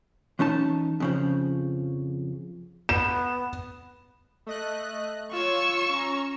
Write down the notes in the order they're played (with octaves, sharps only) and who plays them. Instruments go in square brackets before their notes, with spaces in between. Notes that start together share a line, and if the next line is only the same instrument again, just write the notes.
[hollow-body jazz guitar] E3 C#4 D#4 A5
F2 C#3 F3
[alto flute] B3 [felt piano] E7
[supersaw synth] A3 D#5 F#6
[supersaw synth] F4 C#5 [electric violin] C#6 E6
[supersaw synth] C#4 A#5